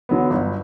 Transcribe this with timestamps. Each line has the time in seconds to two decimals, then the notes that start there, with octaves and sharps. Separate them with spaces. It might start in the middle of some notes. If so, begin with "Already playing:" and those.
0.09 D3 F#3 B3
0.30 G1